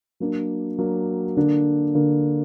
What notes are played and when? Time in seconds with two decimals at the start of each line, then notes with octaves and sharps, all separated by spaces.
0.20 F#3 A#3 D4
0.79 F#3 A#3 D4
1.37 D3 A#3 D4
1.95 D3 A#3 D4